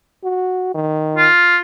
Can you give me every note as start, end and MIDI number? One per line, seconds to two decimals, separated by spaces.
0.24 0.71 66
0.74 1.28 51
1.17 1.58 65